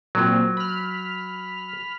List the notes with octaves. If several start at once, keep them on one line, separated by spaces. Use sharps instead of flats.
A#2 F#3 C4
B5 F6